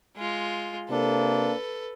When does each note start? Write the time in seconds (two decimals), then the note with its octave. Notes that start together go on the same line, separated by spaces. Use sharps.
0.17 G#3 F4
0.90 C3 A#3 D4 A4 B4